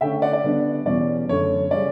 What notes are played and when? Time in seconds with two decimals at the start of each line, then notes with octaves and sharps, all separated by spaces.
0.01 D3 A3 C#4 E5 G5
0.22 D5 F#5
0.33 D5
0.43 D3 G3 B3 D4
0.86 E2 B2 G3 C#4 D5
1.29 F#2 D3 A3 C#5
1.71 C#3 G3 C#4 D5